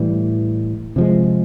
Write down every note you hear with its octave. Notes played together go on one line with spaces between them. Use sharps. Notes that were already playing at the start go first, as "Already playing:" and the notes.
Already playing: A2 E3 G3
C3 F3 G#3